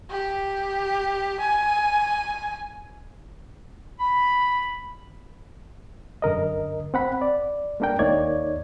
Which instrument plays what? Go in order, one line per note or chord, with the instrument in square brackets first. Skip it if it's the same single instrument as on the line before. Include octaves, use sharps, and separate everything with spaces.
[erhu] G4
G#5
[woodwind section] B5
[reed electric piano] F#2 D3 A#4 D#5
C4 F#5 B5
D5
G#3 A#3 D4 A#4 G5
D#2 A#3 D#4 C#5 D5 G#6